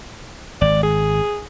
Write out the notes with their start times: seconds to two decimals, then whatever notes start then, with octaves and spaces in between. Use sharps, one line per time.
0.61 G#1 D5
0.83 G#4